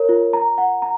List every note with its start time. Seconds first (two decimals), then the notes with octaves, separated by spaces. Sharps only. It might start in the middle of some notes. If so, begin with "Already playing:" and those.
Already playing: A#4 C#5
0.09 F4
0.33 A#5
0.58 F#5
0.82 A#5